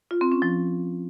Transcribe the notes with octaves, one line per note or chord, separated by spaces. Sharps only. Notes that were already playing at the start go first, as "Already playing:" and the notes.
F4
C4
C#4
F3